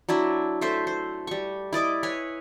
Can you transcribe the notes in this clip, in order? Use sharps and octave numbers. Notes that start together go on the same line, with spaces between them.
F#3 D4 E4 E5
A3 A4 C5 E5
C5
G3 C#6
E4 D5 D#5 D6
B4 C#5 G#5